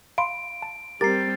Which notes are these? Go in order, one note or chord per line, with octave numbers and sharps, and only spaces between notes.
F5 B5 C6 D7
A5
G3 C4 G4 A#4 A#5 A6 C7